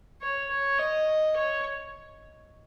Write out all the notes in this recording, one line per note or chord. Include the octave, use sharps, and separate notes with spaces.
C#5
C#5
D#5
C#5